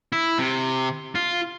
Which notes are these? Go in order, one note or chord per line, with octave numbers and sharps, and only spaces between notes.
E4
C3
F4